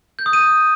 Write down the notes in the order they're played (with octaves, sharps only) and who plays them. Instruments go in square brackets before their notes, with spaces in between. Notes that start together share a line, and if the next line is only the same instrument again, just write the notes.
[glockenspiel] G6
D#6
D#7